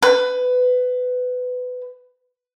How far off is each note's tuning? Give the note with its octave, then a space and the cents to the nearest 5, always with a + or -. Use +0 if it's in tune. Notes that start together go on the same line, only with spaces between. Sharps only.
B4 +20